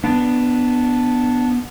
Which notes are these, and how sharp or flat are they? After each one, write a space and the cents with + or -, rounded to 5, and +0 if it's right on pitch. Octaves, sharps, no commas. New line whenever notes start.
B3 +0 D4 +0